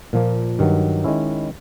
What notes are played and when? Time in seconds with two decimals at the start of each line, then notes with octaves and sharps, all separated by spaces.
0.13 A#2 F3 A#3
0.59 G2 D#3 F#3
1.04 D#3 G#3 C#4 E4